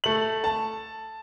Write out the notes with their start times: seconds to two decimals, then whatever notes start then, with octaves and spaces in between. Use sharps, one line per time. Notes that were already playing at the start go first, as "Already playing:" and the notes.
0.04 A3 F#7
0.44 A5